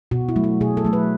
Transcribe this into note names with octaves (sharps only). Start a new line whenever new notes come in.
B2 F#4
E4
F#3 A3
F#4
B2 G#4
A4
F#3 A3
B4